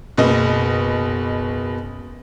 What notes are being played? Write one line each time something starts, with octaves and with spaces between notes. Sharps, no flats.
F#1 B2 D#5